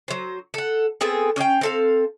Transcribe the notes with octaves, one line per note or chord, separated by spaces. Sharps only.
F#3 C5
A4 F#5
B3 C4 G#4 A4
C#4 D4 F5 G5
C4 A4 F5